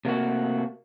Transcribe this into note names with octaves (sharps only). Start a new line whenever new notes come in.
C3 A3 A#3 F#4